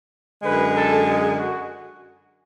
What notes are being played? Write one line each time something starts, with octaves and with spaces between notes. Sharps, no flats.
F#2 D3 G#3 B4
A4
G#4
F#4